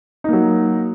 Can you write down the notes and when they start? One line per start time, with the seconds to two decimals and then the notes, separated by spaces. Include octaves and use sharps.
0.24 D#4
0.29 A#3
0.33 F#3